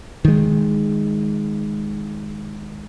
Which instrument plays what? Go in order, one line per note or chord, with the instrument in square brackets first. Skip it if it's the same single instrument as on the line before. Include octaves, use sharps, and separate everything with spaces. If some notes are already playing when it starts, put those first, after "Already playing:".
[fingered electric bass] D#3 G#3